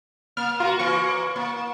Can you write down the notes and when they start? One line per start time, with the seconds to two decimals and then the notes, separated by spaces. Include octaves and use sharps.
0.37 A#3 F6
0.60 F4 F#4 A#4
0.79 E3 A#3 C#6
1.36 A#3